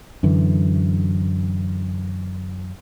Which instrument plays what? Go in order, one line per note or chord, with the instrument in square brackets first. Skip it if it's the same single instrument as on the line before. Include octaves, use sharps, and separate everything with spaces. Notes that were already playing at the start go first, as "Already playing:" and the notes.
[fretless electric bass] F#2 D3 E3